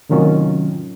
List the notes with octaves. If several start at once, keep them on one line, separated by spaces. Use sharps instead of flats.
A2 C3 D#3 F#3 C#4 F4